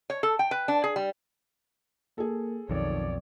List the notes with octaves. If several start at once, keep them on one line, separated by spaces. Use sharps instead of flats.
C#5
A4
G5
B4
D4
G#4
G3
A#3 G#4 A4
B1 F2 D#3 C#5 D5